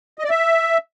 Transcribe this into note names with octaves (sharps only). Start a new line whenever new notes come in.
D#5
D5
E5